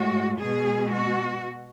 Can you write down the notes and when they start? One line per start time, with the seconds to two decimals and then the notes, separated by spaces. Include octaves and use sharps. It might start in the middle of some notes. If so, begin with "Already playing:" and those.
Already playing: A2 G#3 F#4
0.39 B2 G#3 G#4
0.92 F#4